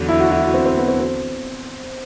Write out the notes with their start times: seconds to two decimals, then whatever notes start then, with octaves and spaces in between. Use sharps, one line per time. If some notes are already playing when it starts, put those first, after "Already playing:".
Already playing: E2 D3 F#3
0.09 E4
0.20 F#4
0.31 E4
0.43 E4
0.54 C4
0.66 C4
0.77 B3
0.88 C4
1.00 C4